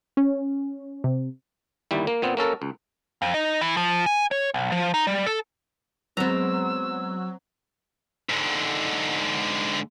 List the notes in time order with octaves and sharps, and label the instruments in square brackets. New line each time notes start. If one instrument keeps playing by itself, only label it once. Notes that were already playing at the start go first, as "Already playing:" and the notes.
[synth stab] C#4
C3
[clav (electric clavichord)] G1 D#2 G3 E4
A#3
A#2 B3 C4
A#3 C#4 A4 A#4
C#2
[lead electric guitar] F2
D#4
E3
F3
G#5
C#5
B1
F3
D#4
G3
A4
[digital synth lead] F#3 [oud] G#3 B3 [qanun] C4 A#5 [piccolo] E6
[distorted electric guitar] G#2 D3